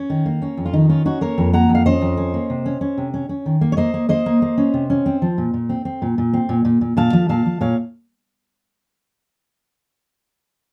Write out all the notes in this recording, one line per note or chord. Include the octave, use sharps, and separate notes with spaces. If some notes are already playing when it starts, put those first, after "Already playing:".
Already playing: C#4
D#3
A#3
C#4
F2
F4
D#3 D#4
C#4 F4
C#4 D#4 F#4
A#3 A#4 C#5
F2
A#3 F#5 A#5
F2
F5
C#4 C5 D#5
F2
C#4
A#3
C3
C#4
C#4
C3
C#4
C#4
D#3
A#3
C#5
A#3 C5 D#5
A#3
A#3 C5 D#5
A#3
A#3
C#4
C3
C#4
C4
F3
A#2
A#2
C4
C4
A#2
A#2
C4
A#2
A#2
A#2
A#2 F5 A5
F3
A#2 F5 A5
F3
A#2 C#5 F5